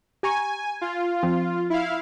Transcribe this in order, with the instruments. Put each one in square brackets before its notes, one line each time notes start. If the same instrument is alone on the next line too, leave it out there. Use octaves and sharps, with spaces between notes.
[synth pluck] G4 A#5 C#6 [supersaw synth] G#5
[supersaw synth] F4
[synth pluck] F3 C4
[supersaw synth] E4 F5